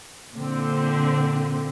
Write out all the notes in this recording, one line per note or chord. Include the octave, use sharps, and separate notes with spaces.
A#2 D3 C4